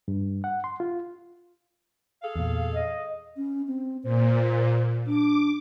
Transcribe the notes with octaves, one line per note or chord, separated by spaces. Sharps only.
G2
F#5
C6
F4
G#4 A4 F5
E2 A#2
D#5
C#4
C4
A#2 C5
D4 D6